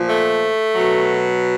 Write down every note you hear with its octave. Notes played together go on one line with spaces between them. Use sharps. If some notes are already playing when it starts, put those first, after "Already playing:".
Already playing: A#2 F3
A3
B2 F#3